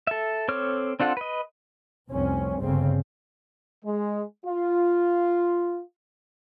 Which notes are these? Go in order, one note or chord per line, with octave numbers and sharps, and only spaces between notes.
A4 E5
C4 A4 C#5 D6 F6
C4 D4 F4 A4 F#5
B4 D#5
F1 C2 C4 C#4
G1 C#3 C4
G#3
F4